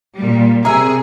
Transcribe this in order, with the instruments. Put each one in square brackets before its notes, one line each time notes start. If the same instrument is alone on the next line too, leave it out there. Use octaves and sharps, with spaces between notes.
[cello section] A#2 G3
[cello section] C3 G#4 [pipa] A#4 E5